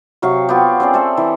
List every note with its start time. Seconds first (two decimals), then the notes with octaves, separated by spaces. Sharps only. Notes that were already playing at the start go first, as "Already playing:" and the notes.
0.22 C3 F#3 F5 C#6
0.49 B3 F4 G4
0.80 C4 C#4 G#4 D5
0.94 A4 C5 D5 E5
1.17 E3